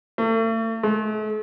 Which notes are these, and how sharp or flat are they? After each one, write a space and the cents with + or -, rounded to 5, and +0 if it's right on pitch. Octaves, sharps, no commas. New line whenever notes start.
A3 +40
A3 -45